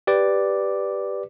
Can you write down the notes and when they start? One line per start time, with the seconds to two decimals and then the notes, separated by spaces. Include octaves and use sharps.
0.07 G4 B4 D5 D6